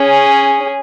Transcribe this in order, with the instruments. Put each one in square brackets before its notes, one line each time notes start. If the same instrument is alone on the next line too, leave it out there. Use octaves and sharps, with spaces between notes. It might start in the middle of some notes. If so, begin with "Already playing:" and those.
Already playing: [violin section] C#4 G#4